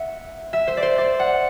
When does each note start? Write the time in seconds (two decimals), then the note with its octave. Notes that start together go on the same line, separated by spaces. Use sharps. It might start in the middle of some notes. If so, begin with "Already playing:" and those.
Already playing: E5 F#5
0.53 E5
0.67 C5
0.77 D5
0.83 C5
0.98 D5
1.20 F#5